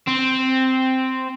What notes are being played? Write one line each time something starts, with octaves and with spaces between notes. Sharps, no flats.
C4